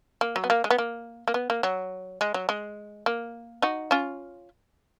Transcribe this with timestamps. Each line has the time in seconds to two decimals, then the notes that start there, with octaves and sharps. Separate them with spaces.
0.21 A#3
0.36 F#3
0.44 B3
0.50 A#3
0.64 G#3
0.70 B3
0.78 A#3
1.28 A#3
1.34 B3
1.50 A#3
1.63 F#3
2.21 G#3
2.34 F#3
2.49 G#3
3.06 A#3
3.62 D#4 F#4
3.91 C#4 F4